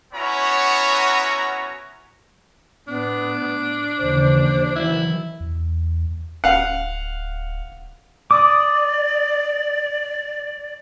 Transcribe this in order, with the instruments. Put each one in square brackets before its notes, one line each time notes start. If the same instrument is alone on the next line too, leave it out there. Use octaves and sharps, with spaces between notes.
[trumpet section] B3 C#4 E4 F#4 C#5 A#5
[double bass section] A2 [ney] B3 [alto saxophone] D4
[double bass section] D#2 C#3 E3 [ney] C5
[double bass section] D#3 E3 F#3 [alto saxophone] E4
[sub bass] E2
[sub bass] D1 [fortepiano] F5 F#5
[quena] D5 [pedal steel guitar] D6 D#6